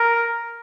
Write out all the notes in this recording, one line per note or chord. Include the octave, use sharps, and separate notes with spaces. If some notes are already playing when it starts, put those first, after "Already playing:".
Already playing: A#4